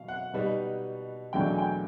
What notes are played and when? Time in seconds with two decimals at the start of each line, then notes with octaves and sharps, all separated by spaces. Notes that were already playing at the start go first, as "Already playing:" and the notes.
Already playing: B2 F#3 F5
0.08 F#5
0.34 B2 G3 B3 D#4
1.33 E2 B2 F#3 A3 D4 G5
1.53 G#5
1.58 G5